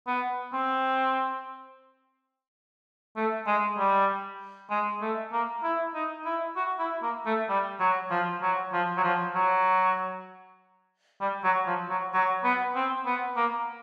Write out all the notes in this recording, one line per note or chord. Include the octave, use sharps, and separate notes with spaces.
B3
C4
A3
G#3
G3
G#3
A3
A#3
E4
D#4
E4
F#4
E4
A#3
A3
G3
F#3
F3
F#3
F3
F#3
F3
F#3
G3
F#3
F3
F#3
F#3
B3
C4
B3
A#3